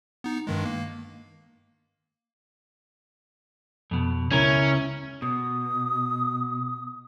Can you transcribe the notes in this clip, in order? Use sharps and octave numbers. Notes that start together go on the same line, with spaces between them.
B3 D#4
G2 D#3 G#3
A#3
F2 B2
C#2 C#4 E4 A#4
B2 D#6